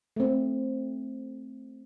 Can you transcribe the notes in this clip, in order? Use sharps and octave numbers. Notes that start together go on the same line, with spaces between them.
A3 C4